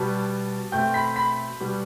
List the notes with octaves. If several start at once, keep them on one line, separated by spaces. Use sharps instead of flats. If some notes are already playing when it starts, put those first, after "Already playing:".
Already playing: B2 G3 B3 A5
B2 A3 C4 G5 G6
B5 B6
B5 B6
B2 G3 B3